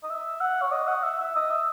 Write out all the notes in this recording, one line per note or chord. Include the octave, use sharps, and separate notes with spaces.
D#5
E5
F#5
C#5
D#5
F#5
E5
E5
D#5
E5